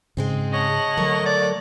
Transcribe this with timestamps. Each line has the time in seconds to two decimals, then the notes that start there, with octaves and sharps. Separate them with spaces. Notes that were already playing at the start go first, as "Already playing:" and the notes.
0.17 G#2 C#3 G#3 C4 G#4
0.53 C#5 D#5 F#5 A5
0.97 D3 F#3 A3 A#4
1.26 D5